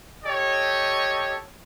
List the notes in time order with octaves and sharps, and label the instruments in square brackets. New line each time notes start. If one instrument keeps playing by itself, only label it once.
[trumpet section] G4 A4 C#5 D#5